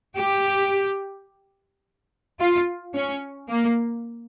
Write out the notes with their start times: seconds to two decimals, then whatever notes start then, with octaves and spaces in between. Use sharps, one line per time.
0.16 G4
2.39 F4
2.94 C#4
3.49 A#3